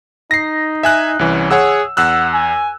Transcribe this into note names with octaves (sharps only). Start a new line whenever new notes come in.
D#4 A#6 C7
E5 G#5 F#6
C2 E3 C#4
G#4 C#5 F#5 E6
E2 F#5 E6 F#6
G#5